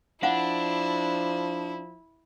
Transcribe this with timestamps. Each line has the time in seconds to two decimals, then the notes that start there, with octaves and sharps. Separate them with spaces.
0.23 F3 D4 E4 F5 F#5